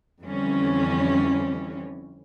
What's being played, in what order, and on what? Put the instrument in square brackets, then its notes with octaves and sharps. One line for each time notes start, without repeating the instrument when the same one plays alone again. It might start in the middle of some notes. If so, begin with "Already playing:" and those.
[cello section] F2 D3 E3 G3 C4 C#4